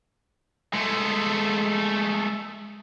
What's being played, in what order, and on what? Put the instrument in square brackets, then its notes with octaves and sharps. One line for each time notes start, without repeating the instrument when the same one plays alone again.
[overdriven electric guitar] G#3 A3